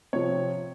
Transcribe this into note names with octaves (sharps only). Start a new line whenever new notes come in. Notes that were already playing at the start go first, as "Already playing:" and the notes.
C3 F3 C4 C#5